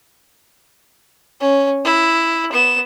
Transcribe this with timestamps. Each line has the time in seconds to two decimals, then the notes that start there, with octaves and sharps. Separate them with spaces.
1.40 C#4
1.84 E4
2.52 B3 E7